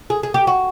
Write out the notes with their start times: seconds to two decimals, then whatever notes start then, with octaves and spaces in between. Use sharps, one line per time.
0.10 G#4
0.23 G#4
0.34 G4
0.47 F#4